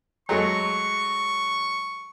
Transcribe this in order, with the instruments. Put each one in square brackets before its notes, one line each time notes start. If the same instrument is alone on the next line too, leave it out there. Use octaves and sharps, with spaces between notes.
[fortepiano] F#3 G#3 A3 [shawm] C#6